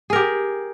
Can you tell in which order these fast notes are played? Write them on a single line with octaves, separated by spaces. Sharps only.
G#4 A#4 G4